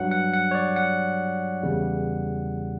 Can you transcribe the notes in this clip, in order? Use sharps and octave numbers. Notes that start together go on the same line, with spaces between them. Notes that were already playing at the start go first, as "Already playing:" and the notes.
Already playing: G2 F#3 F#5
F#5
F#5
C#5
D5
F#5
E2 C#3 G3